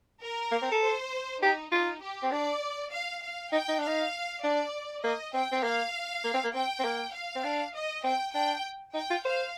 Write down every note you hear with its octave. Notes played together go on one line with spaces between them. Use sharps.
A#4
A#3
C4
A4
C5
D#4 G4
D#4 F4
G4
C4
D4 D5
F5
F5
D#4 G5
D#4
D4
D#4 F5
D4 D5
A#3 D#5
C4 G5
C4
A#3 F5
A#3
C4
A#3
C4 G5
C4
A#3
F5
C4
D4
D#5
C4 G5
D4 G5
D#4 G5
F4
C5 F5